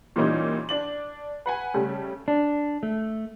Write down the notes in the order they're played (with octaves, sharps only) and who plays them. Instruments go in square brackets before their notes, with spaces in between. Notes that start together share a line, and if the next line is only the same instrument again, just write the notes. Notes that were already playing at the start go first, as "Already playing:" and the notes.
[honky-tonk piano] A#2 E3 G3 A#3 C#4 D#4
D4 D5 F#7
B4 F#5 G#5
C#3 G3 A3
[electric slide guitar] D4
A3